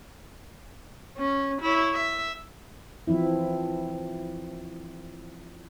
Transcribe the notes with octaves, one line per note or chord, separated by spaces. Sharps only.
C#4
E4 C#5
E5
E3 F3 C4 E4